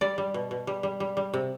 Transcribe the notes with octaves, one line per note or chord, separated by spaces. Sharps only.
G3 D5
G3
B2
B2
G3
G3
G3
G3
C3